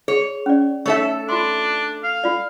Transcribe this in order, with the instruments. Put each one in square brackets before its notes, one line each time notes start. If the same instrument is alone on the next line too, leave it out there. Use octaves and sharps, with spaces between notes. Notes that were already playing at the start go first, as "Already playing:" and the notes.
[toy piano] G#4 [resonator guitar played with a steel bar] C#5
[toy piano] C#4 D5
[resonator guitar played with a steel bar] A3 A4 E5 [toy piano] D#4 C#5 C#6
[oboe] D4 [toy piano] F4 C6
[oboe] F5
[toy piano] F4 D5